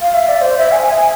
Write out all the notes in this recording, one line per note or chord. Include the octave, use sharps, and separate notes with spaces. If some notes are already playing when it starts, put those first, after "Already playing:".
F5
E5
D5
C5
E5
G#5
G#5